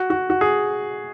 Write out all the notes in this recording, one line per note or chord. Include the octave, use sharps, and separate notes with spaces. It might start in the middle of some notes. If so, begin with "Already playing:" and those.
Already playing: F#4
F#4
F#4
G#4